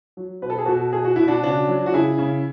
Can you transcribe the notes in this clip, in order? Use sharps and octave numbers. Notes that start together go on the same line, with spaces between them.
F#3
B2 B4
A4
G#4
B2 F#4 A4
B2 G#4
F#4
B2 E4
D4 F#4
C#3 D4 F#4
F#3
F#4
C#3 E4 G#4
C#3